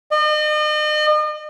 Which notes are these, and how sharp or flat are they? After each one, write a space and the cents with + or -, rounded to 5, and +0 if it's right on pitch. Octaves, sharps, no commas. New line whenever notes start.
D#5 -40